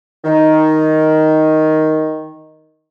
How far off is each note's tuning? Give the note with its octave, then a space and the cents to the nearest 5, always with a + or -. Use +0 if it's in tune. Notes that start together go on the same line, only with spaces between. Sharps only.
D#3 +5